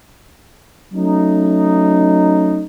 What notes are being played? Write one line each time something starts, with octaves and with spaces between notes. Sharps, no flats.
F#3 A3 C#4 D#4